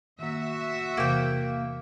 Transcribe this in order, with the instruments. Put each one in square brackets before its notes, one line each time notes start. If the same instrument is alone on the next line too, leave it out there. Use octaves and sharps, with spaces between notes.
[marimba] D#3 A#3 [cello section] F#4 E5
[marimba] E2 C3 E3 [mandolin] A#3 G5